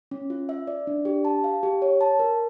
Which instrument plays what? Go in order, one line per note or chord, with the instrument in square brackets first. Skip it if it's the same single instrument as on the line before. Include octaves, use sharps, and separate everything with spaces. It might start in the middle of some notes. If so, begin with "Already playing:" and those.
[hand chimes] C#4
F4
E5
D5
D4
G4
A5
F5
G4
C#5
A5
A#4